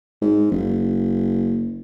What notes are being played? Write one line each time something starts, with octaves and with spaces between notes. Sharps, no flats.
G#2
F#1